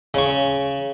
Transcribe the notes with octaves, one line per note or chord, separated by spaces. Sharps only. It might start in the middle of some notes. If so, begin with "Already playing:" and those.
C#3 C#6